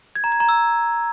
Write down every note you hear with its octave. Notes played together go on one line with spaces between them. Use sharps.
G#6
A#5
G#6
A#5
E6